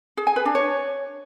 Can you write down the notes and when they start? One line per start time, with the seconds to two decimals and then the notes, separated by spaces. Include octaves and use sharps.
0.17 G#4
0.27 G#5
0.36 B4
0.45 D4
0.55 C#5